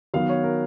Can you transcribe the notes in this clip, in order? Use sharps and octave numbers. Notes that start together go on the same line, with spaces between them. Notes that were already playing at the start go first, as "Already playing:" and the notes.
D#3 F#3 B3 F5
C#5
A#4